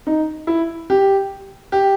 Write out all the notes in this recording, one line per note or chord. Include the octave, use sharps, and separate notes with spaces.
D#4
E4
G4
G4